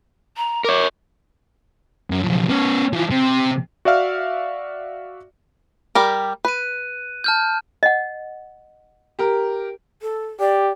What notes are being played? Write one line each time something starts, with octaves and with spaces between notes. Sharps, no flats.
A#5
A#4 C#5 D6
F#2
B1 F2
B3 C#4
E3 F3
C3
F#4 D5 E5 F5 F6
G3 G4 A#4
B4 F#6 D#7
A5 F6 G6
D#5 F#5
G4 A#4
A4
G4 D5